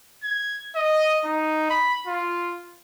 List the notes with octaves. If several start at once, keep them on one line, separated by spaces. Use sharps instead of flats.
G#6
D#5
D#4
B5
F4